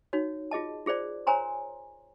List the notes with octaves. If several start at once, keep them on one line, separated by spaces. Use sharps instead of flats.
D#4 F#4 C#5
F4 G#4 D#5 A5
F4 G#4 C5 D5
A#4 C5 C#5 G#5 A#5 C6